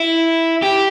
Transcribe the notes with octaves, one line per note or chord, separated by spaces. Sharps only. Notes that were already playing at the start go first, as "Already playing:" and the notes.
Already playing: E4
G4